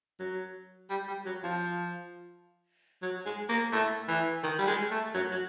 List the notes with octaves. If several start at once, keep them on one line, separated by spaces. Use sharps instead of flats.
F#3
G3
G3
F#3
F3
F#3
G#3
A#3
A3
E3
D#3
G3
G#3
A3
F#3
F#3